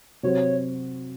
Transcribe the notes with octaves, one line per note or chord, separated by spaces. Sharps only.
C3 F#3 C4 F#4 C#5